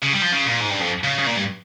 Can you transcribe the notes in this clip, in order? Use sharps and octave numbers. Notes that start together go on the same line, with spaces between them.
C#3
G3
F3
C#3
A#2
G#2
G2
F2
C#3
C#3
A#2
G2